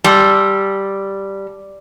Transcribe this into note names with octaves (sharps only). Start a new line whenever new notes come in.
G3 A5 C6 E6